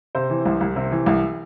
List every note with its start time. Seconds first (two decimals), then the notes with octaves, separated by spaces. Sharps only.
0.15 C3 C5
0.30 E3
0.46 C2
0.61 C2
0.76 C3
0.92 E3
1.06 C2